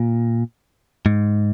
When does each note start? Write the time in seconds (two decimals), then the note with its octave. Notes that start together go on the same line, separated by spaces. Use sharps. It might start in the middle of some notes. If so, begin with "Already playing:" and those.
Already playing: A#2
1.06 G#2